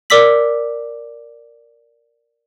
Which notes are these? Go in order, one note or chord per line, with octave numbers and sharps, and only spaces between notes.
A#4 D5 D6 E6 B6 F#7